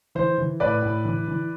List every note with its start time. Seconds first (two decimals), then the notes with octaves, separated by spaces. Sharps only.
0.15 E3 C5
0.38 E3
0.60 A2 B4 D5
0.82 A2
1.05 E3
1.28 E3